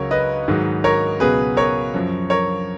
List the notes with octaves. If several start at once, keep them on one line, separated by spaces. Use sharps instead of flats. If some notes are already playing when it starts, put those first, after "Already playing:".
Already playing: C#2 C#3 F#3 A#4 C#5
B4 D#5
G#2 D#3 F#3
A#4 C#5
C#2 B2 F#3 G#4 B4
A#4 C#5
F#2 F3
A#4 C#5